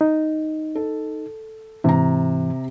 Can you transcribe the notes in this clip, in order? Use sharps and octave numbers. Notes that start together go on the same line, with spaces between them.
D#4
A4
G#2 C3 E3 A#5